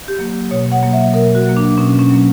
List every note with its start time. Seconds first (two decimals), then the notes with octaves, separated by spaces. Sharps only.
0.08 G4
0.19 F#3 A#3
0.51 B2 C#5
0.71 F#5
0.83 F#3 A#3
0.93 E5
1.14 B2 A#4
1.35 F#4
1.45 F#3 A#3
1.57 D4
1.78 B2 C#4
1.99 C#4
2.10 F#3 A#3